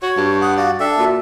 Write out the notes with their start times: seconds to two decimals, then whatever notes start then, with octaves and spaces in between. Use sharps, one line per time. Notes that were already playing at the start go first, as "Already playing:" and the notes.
0.02 F#4 C#5 C#6
0.17 G2
0.41 F#5 D#6
0.57 F#4 D5 F5
0.80 D4 A4 E5 G5
0.97 A#2 F#4